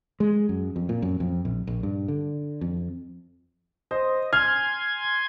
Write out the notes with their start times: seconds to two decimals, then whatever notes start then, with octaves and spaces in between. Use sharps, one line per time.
0.20 G#3
0.49 F#2
0.76 F2
0.89 A#2
1.02 F#2
1.20 F2
1.45 A#1
1.67 A#1
1.83 G2
2.08 D3
2.61 F2
3.91 C5 D#5
4.33 G#5 C6 F6 G#6